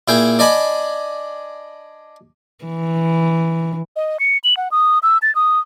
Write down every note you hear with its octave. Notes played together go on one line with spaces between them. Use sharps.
A#2 E4 G#4 G5
D4 D5 D#5 G#5 B5
E3
D#5
C#7
F#7
F#5
D#6
E6
A6
D#6